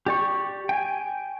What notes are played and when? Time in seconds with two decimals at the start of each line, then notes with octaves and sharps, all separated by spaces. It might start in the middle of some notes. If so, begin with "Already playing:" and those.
0.06 G4 D5 C#6
0.69 G5 G#5